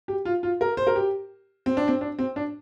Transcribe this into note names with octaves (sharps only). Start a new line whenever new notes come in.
G4
F4
F4
A#4
C5
A#4
G4
C4
D4
C4
D4
C4
D4